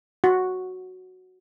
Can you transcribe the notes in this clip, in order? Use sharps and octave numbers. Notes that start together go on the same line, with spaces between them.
F#4